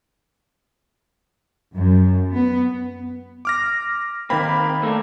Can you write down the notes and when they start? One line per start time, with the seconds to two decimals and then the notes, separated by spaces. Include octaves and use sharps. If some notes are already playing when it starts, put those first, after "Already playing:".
1.74 F#2
2.33 B3
3.45 D6 F6 A#6
4.30 D#3 A#3 C4 B5
4.83 A3 A#3 D4